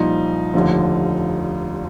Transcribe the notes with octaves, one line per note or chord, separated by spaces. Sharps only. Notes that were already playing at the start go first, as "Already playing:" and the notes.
Already playing: C2 A#2 F3 D#4
F1 D#2 D3 F3